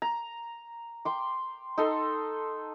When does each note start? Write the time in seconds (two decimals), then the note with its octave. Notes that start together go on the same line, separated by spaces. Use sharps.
0.02 A#5
1.05 G5 C6 D6
1.78 D#4 A4 C6